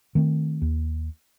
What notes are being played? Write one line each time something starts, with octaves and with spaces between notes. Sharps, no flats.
D#3 A3 C4
D#2